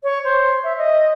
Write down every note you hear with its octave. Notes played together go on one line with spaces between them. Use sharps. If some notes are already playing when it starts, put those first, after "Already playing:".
C#5
C5
E5
D#5